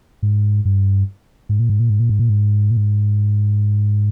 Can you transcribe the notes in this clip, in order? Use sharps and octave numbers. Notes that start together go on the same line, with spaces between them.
G#2
G2
G#2
A#2
G#2
A#2
G#2
A#2
G#2
A#2
G#2
A#2
G#2